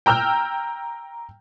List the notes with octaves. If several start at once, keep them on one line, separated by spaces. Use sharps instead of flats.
G5 A#5 E6 F6 G6